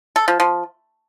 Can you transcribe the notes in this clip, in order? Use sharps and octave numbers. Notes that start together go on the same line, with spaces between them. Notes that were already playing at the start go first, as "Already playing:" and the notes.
A4
F3
F3